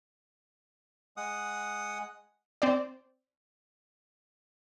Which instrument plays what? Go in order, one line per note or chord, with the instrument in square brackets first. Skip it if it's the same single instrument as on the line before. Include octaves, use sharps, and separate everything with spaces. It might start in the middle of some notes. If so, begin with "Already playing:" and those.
[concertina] G#3 F#5 D#6
[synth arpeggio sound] C4 C5 D5